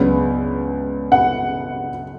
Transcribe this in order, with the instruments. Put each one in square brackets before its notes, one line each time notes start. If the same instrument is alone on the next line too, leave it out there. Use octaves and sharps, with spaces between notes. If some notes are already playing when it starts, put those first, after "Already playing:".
Already playing: [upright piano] C#2 C#3 F#3 B3 D4
F#5